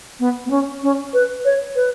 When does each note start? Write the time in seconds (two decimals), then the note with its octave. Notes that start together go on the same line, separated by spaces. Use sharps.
0.20 B3
0.46 B3
0.50 C#4
0.82 C#4
1.13 B4
1.45 C#5
1.76 B4